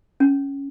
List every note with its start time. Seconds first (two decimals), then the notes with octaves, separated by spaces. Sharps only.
0.20 C#4